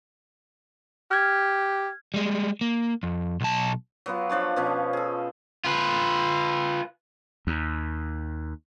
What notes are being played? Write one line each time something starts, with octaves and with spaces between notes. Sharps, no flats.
G4 F6 G#6
G3 G#3
A#3
F2
B1 A5
F#3 B3 F4
F3 D4 C#5 A5
B2 F3 C#4
G#4 A4
F4 B4
D#2